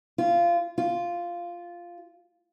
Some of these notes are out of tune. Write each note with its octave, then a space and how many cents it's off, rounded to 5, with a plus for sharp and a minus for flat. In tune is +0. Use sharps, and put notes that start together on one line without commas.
F4 -20
F4 -5